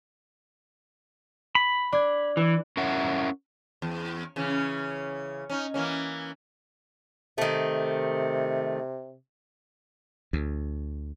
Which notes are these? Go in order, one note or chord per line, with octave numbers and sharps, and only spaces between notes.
B5
D4 G#6
E3
C#4 E4 A#4 E5 F#5
E2
C#3 E3 C#4
C#4 D#4
E3 A#3 C#4
C3 D#3 A3
D2